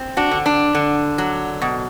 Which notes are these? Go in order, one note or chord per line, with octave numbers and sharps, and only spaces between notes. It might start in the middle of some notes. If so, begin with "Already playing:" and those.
Already playing: C4
D4 F#4
D3
D4
D3
F#3
B2